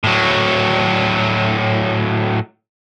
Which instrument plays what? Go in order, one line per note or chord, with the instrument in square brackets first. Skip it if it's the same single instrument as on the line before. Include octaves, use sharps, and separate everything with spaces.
[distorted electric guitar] A2 F#3